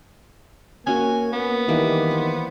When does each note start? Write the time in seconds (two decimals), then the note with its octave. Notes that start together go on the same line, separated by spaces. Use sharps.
0.87 A#3 C#4 F#4 G#5
1.33 A#3 B3
1.68 D#3 E3 G3 A#3
2.11 C5